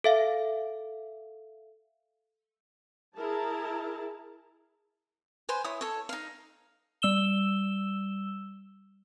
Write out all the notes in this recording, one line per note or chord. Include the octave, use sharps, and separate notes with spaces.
A4 E5 F5
E4 G#4 A#4 A5
B4 C5 G#5
E4 C#5 D#6
A4 C#5
D#4 F5
G3 E6 E7 G7